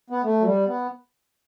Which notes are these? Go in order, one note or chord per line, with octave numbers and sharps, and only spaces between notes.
B3
A3
F#3
G3
B3